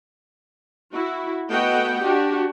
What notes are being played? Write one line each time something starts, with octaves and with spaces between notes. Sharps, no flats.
E4 F#4
A3 B3 F#4 D#5 F#5 G5
D4 F#4 G4